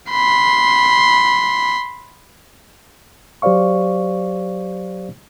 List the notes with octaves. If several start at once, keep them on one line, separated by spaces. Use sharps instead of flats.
B5 C6
F#3 G4 C5 D5 F5 C#6